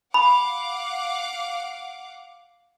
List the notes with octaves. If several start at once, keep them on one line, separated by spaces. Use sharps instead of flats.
F5 F#5 B5 D6